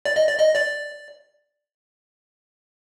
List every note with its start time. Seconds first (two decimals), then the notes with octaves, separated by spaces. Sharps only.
0.05 D5
0.16 D#5
0.27 D5
0.39 D#5
0.56 D5